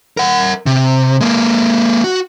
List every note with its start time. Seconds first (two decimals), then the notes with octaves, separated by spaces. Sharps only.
0.17 A#4 F#5
0.66 C3
1.21 G#3 A#3
2.04 F#4